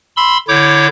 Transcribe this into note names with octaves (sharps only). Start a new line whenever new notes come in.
B5 C6 E6
D3 E4 C#5 D6 G6